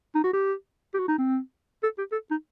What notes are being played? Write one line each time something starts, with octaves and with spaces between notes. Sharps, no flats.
D#4
F#4
G4
G4
F#4
D#4
C4
A4
G4
A4
D#4